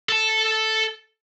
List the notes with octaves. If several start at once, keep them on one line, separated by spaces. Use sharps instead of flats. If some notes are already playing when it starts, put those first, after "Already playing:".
A4 A5